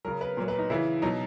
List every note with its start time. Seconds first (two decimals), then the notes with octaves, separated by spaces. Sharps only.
0.05 C#3 F#3 A#4
0.21 B4
0.37 A#2 F#3 A#4
0.48 B4
0.59 D#4
0.70 C#3 E3 E4
1.02 B2 F#3 D#4